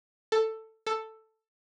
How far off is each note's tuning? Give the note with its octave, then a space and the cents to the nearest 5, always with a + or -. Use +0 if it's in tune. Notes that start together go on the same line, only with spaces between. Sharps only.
A4 +10
A4 +5